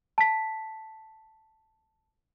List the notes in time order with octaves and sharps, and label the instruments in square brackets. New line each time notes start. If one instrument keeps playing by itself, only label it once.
[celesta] A5 B6